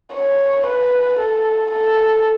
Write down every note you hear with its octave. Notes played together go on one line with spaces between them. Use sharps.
C#5
B4
A4
A4